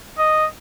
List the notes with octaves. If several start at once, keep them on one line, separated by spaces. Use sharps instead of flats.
D#5